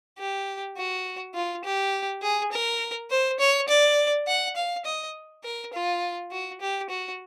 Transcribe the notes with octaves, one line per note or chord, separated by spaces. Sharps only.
G4
F#4
F4
G4
G#4
A#4
C5
C#5
D5
F#5
F5
D#5
A#4
F4
F#4
G4
F#4